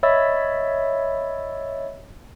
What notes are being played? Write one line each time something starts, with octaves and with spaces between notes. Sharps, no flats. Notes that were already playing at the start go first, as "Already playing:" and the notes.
C#5 D#5 E5 B5 E6 A6